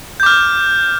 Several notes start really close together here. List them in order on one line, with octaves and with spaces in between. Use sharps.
G6 D6 F6